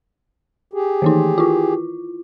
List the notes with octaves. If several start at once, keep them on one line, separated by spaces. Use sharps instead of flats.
G4 G#4
D#3 E3 D#4
E4 F4